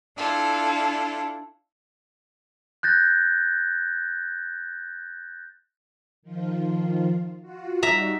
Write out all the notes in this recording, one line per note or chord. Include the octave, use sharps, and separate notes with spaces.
D4 E4 F4 A4
F#6 G6 A6 A#6
D#3 F3 F4
F4 F#4
G3 D#4 F#4 E5 A#5